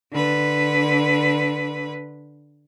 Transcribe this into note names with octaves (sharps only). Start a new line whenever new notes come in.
D3 B4